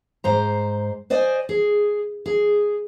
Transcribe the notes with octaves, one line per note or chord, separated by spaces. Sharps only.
G#2 C5 A#5
C5 D5 D#5 G#5
G#4
G#4